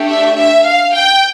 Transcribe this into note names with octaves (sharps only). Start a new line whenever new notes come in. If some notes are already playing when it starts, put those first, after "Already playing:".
Already playing: A3 D4 G4
E5
E5
F5
G5